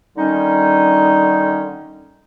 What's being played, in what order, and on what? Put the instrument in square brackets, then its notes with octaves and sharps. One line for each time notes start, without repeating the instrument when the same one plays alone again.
[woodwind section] D3 D#3 G3 C#4 D#4